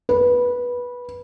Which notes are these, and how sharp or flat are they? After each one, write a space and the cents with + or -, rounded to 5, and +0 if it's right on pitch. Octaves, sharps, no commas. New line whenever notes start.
B4 -15